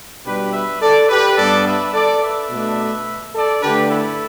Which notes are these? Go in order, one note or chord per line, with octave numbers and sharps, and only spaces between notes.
B2 G3 D4 G4 B4
B4 E5
A4 D5
G4 B4
G2 G3 B3 D4 A4 D5
B4 E5
A4 D5
B4 E5
B2 A3 D4
A4 D5
D3 A3 D4 G4 B4
E4 A4